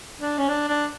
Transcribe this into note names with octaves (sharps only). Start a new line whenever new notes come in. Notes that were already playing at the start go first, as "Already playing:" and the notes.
D4
C#4
D4
D4